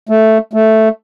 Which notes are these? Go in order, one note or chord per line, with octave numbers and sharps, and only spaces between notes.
A3
A3